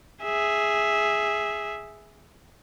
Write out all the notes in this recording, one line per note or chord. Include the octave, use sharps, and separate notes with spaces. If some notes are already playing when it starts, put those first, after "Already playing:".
G#4 E5